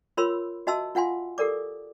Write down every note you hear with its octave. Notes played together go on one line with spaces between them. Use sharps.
F4 A#4 C#5 B5 C6 E6
F#4 D#5 E5 A5 C6 E6
F4 F5 F#5 G#5 C6
G4 A4 A#4 D5 D6